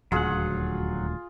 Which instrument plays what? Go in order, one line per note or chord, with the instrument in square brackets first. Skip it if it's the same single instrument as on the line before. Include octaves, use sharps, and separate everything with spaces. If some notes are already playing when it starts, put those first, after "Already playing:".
[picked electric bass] D#1 D2 [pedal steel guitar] F#3 F#5 [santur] F4 G#4